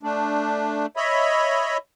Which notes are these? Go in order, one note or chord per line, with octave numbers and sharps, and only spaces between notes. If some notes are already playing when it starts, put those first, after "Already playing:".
A3 D4
C#5 D#5 E5 B5